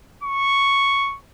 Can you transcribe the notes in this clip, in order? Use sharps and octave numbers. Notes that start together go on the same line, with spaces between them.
C#6